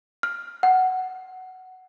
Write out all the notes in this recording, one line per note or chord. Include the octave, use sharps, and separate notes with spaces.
F6
F#5